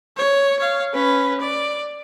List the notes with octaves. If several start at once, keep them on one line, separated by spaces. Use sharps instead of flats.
C#5
C#5 F5
C#4 B4
D5